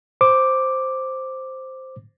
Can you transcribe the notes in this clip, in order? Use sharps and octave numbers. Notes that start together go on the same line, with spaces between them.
C5 D6